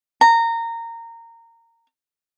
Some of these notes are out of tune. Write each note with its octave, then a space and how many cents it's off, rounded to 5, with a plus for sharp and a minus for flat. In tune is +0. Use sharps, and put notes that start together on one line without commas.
A#5 -20